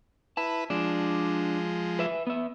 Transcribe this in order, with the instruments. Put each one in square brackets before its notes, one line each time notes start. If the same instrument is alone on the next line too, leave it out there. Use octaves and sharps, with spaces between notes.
[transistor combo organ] E4 B4 [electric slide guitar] A5
[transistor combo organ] F3 G#3 [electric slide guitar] D4
[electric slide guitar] B4 E5
B3 E5